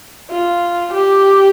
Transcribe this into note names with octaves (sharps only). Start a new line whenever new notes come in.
F4
G4